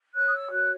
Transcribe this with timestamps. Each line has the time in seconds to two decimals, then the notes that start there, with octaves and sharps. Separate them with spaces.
0.15 C#5 F#6
0.27 D#6
0.33 E6
0.50 F#4 F#6